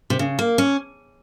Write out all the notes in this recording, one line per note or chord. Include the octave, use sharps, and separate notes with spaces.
C3
C#3
A#3
C#4